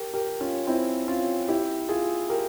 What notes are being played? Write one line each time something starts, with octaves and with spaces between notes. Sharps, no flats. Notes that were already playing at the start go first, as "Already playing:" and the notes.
Already playing: G4 A#4
G4 A#4
C#4 F4
C4 E4
C#4 F4
E4 G4
F4 G#4
G4 A#4